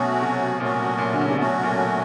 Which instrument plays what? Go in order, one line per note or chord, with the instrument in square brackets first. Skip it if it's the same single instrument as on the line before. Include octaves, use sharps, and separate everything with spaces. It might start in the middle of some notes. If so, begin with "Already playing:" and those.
Already playing: [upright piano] B2 [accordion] F#3 A3 C#4 F#4
[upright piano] C3
[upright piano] A#2 [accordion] F#3 A3 C#4 F#4
[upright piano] A#2
D3
C#3
C3
[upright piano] B2 [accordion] F#3 A3 C#4 F#4
[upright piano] A#2